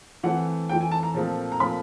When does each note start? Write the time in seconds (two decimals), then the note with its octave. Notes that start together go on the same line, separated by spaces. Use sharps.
0.23 E3 A3 C4 F#5
0.69 E3 A3 C4 G5
0.81 G#5
0.91 A5
1.03 A#5
1.14 A#2 F3 A3 C4
1.52 A#5
1.60 A#2 F3 A3 C4 B5